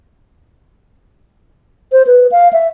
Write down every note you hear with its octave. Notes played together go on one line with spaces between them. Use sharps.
C5
B4
F5
E5